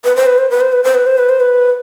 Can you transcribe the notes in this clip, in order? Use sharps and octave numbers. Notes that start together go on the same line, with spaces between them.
B4
C5
B4
C5
B4
C5
B4
C5
B4
C5
B4
C5
B4